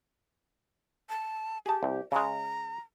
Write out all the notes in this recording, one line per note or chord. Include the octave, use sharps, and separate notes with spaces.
A5
G4 G#4 A5
C2
C#3 G#3 A#5